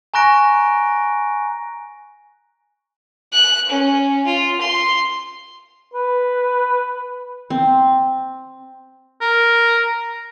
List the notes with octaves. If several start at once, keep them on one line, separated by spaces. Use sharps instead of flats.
G#5 A#5 C#6 F#6 A#6 D7
F#6
C#4
F4
C6
B4
C4
A#4